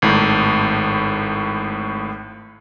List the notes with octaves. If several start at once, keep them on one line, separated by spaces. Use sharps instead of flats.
G#1 A2